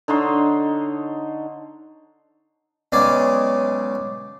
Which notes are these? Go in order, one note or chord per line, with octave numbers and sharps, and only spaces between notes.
D3 D#4 C#5 C6
B1 C#3 G#3 D5